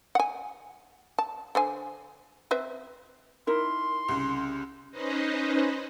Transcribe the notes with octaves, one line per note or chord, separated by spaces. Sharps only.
F#5 G#5
A5
D3 C5 G#5
C4 B4 E5
D#4 E4 A#4 C6
C2 C#3
C#4 D#4 B4 C5 D#5